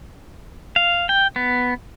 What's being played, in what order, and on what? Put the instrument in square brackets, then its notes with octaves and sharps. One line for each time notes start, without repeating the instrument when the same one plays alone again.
[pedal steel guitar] F5
G5
B3